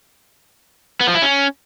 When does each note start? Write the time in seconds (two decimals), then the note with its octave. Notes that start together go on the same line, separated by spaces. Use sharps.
1.01 B3
1.08 F3
1.15 E4
1.22 C#4